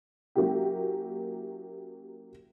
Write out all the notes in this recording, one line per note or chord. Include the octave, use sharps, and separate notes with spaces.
F#3 A#3 C#4 E4 G4